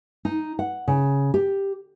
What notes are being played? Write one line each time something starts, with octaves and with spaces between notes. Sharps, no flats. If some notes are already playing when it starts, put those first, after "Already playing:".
D#4
F#5
C#3
G4